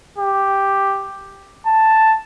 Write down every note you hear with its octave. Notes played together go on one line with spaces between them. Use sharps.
G4
A5